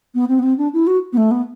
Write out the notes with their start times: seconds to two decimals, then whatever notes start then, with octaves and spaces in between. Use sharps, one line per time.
0.14 B3
0.28 C4
0.39 B3
0.43 C4
0.58 D4
0.73 E4
0.87 F#4
1.13 B3
1.17 A3
1.31 B3